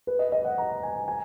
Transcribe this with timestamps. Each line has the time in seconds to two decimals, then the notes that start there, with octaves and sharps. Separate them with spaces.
0.07 B4
0.19 D#5
0.32 D#5
0.45 F#5
0.58 A#5
0.83 G#5
1.08 G#5